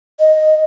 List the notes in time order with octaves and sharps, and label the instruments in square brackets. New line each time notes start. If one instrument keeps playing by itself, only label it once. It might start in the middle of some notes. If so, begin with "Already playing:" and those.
[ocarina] D#5